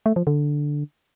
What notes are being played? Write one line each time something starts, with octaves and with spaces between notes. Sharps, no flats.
A3
F3
D3